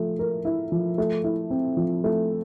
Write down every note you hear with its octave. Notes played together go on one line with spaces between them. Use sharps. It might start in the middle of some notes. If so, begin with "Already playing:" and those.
Already playing: F3 A3
A#4
E4
F3
A3
E4
C4
F3
A3